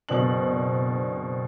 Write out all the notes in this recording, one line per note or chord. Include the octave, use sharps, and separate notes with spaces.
F#1 B2 C4 D4 F#7